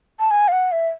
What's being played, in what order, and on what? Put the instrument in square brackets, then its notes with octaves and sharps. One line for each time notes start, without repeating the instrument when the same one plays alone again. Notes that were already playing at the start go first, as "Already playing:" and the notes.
[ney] A5
G#5
F5
F#5
E5